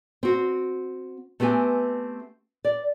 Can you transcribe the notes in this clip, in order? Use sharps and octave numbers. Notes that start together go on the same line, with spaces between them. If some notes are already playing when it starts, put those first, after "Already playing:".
C4 F#4
A3 B3 C4 G4 G#5
D5